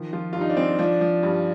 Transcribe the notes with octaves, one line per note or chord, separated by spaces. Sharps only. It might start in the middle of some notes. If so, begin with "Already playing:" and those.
Already playing: D#3 F3
F3 F4
G2 F4
D#4
D4
F3 C4
F3 D4
F3
G2